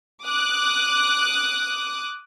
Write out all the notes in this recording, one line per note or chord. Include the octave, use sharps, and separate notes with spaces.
D6 D#6 F#6